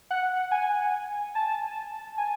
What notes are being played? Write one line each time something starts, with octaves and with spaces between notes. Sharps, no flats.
F#5
G#5
A5
G#5